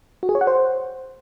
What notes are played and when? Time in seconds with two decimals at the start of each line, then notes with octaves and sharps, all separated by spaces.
0.23 F#4
0.29 G#4
0.35 C#5
0.41 F#5
0.47 C5